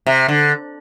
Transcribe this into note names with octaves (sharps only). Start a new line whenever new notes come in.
C3
D3